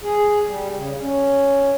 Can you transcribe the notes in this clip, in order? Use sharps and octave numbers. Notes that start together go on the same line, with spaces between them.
G#4
G3
C#3
C#4